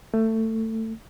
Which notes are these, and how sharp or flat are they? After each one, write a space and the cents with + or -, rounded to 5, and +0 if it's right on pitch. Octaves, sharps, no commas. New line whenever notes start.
A3 +20